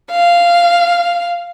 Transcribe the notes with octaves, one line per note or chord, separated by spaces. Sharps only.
F5